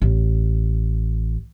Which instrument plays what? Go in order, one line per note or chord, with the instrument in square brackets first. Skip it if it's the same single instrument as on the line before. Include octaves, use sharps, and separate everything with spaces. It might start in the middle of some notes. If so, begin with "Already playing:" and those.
[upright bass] A1